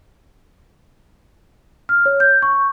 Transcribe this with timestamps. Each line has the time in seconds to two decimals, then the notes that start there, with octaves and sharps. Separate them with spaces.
1.89 F6
2.06 C#5
2.20 G6
2.42 C#6